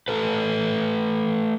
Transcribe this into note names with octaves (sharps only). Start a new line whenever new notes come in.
A3 A4 B4